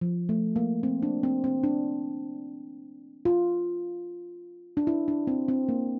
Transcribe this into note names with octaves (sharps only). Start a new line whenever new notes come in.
F3
A3
A#3
C4
D4
C4
C4
D4
F4
D4
E4
D4
C4
C4
A#3